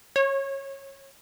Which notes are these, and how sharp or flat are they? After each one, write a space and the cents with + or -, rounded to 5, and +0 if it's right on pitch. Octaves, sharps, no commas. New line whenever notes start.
C#5 -20